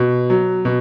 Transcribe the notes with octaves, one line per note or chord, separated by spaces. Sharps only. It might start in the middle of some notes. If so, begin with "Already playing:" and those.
Already playing: B2
F#3
B2